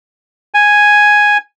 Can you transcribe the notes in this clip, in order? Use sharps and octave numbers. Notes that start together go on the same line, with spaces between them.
G#5